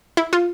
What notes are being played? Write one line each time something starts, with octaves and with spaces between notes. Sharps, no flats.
E4
F4